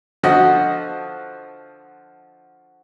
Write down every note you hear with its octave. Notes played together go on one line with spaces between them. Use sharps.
D3 F3 F#4 D#5 F#5